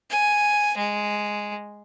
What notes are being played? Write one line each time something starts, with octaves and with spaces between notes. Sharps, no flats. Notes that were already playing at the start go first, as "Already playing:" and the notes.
G#5
G#3